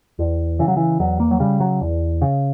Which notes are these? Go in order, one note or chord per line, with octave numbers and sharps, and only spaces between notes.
E2
C#3 E3
F#3
E3
E2 F#3
A#3
F#3
C#3 G3
F#3
E2
C#3